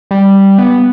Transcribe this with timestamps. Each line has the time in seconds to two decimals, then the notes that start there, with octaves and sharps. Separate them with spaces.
0.11 G3
0.58 B3